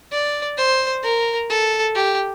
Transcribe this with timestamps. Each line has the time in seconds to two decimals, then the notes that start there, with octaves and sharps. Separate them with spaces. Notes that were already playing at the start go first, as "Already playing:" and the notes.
0.12 D5
0.58 C5
1.03 A#4
1.50 A4
1.95 G4